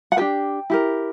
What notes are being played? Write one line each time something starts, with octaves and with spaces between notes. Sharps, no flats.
F#5
D4 G4 B4 G5
E4 G4 A#4